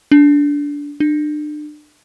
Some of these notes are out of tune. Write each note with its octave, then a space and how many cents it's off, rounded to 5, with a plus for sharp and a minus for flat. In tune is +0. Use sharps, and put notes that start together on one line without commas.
D4 -20
D4 +35